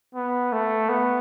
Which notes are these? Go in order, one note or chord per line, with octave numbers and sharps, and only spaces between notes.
B3
A3
B3